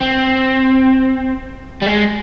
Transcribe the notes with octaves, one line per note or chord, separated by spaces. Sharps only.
C4
G3
G#3